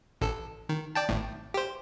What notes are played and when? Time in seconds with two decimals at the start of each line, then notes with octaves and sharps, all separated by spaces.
0.21 A1 A4
0.69 D#3
0.95 D5 G5 A5
1.09 G#1 A2
1.54 G4 C5